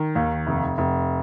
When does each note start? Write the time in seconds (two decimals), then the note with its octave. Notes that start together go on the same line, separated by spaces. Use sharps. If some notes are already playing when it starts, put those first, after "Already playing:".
Already playing: D#3
0.16 D#2
0.47 F1
0.78 F1